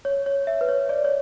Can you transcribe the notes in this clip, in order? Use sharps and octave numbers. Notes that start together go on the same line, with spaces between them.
C#5
C#5
E5
B4
C#5
D5
C#5